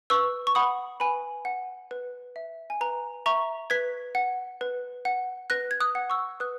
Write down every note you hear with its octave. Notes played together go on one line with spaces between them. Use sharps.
B4 C#6 E6
C#6
F#5 B5 D#6
B4 G#5 B5
F#5
B4
E5
G#5
B4 A#5
E5 A#5 C#6
B4 G#6 B6
F#5
B4
F#5
B4 F#6 A#6
G#6
D#6 F#6
F#5
C#6 E6
B4 D#6 F#6